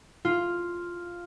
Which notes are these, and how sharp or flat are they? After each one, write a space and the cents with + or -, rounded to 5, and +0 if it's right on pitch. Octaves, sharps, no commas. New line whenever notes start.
F4 +0